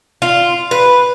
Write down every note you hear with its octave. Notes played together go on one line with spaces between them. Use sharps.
F4
B4